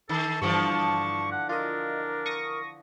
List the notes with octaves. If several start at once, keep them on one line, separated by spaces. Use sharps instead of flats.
D#3 A4 A5
G2 D3 E3 F3 C#6
F#5
D4 F4 A#4 D#5
C#6 D#6 A#6